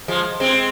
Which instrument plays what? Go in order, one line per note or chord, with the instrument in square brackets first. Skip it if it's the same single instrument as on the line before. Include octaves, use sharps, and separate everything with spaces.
[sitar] F3 G#3
G#3 C4